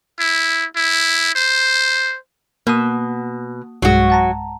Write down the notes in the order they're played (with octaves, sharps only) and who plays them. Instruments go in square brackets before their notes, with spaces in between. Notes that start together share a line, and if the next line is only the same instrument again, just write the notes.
[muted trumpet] E4
E4
C5
[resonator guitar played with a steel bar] B2 [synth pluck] A#3 D#6
[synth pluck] B1 G2 G#3 [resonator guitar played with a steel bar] F#3 F#4
[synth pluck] F#5 A5 A#5